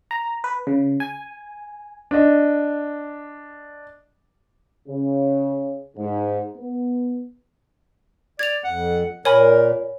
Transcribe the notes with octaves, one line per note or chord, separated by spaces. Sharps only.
A#5
B4
C#3
G#5
D4 D#5
C#3
G#2
B3
D5 G#6 F7
F2 F#5
A#2 A#4 C#5 G#5 B5